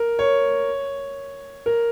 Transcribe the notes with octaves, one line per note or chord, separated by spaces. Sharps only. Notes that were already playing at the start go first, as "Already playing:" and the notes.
Already playing: A#4
C#5
A#4